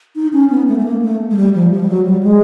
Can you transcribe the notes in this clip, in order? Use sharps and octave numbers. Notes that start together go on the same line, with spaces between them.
D#4
C#4
B3
A3
A3
A#3
A3
G#3
G3
F3
F3
G3
F#3
G3
G#3